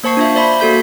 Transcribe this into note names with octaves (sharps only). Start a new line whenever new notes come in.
A#3 C5 A5 C#6 C7
D4 F4 E5
C5 D5 E5 B5 C6
A#3 F#4 A4 G6 B6